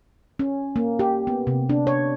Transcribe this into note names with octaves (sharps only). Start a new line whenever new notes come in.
C#4
A#3
G4
B3
C3
D4
C#5